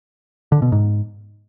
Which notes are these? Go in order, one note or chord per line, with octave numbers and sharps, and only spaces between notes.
D3
B2
G#2